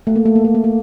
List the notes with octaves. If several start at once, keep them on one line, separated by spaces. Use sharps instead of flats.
A3
A#3
A3
A#3
A3
A#3
A3